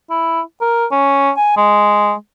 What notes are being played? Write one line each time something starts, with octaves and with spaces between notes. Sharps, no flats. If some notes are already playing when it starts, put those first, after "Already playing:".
E4
A#4
C#4
G#5
G#3